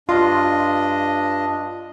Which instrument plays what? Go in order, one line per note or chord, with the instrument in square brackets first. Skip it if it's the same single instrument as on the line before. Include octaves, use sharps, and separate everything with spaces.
[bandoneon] G2 D4 D#5 [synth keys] F4